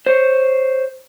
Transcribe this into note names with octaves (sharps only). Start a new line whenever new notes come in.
C5 C#5